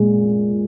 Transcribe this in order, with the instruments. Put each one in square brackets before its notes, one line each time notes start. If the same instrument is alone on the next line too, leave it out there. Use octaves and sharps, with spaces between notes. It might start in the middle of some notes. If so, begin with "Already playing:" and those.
Already playing: [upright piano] A#2 G#3